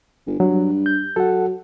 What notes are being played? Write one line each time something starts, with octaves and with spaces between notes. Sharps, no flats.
G1
G2 F#3
G6
F#3 A4 F#5